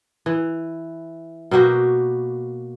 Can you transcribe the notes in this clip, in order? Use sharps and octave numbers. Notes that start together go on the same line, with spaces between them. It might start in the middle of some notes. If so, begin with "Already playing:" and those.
E3
B2 A#3 F#4 G4